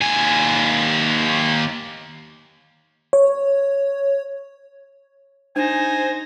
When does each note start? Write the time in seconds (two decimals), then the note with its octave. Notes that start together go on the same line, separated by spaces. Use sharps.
0.01 D#2 G#5
3.13 C#5
5.56 D4 D#4 C5 G#5 A#6